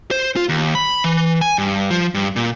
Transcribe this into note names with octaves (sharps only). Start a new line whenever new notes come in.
C5
F4
D#2
B5
E3
G#5
G2
F3
G2
A#2